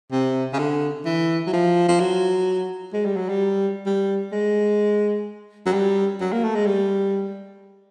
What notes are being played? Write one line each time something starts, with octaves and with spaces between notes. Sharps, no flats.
C3
C#3
D3
E3
F#3
F3
F3
F#3
G#3
G3
F#3
G3
G3
G#3
F#3
G3
F#3
A#3
A3
G#3
G3